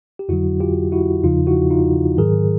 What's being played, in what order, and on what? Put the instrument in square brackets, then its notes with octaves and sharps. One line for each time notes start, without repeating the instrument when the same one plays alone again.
[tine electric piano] G4
F2 D3 F#3 E4 F#4
F4 G4
E4 F#4
E2 C#3 F3 D#4 F4
E4 F#4
D#4 F4
G#2 D#3 F#3 G#4 A#4